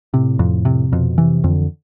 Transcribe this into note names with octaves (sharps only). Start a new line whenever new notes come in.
A2 C3
F2
C3
F2 B2
C3 E3
F2 D3